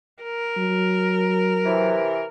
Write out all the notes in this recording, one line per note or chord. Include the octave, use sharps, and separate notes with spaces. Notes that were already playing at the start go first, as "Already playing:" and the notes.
A#4
F#3
C3 E3